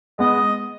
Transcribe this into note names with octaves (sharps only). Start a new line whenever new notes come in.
G#3 B3 D#5